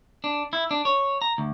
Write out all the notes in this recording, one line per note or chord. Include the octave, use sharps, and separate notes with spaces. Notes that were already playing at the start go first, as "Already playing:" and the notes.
D4
E4
D4
C#5
A#5
D2